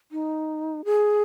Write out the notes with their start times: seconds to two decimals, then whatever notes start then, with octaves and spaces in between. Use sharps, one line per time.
0.12 D#4
0.85 G#4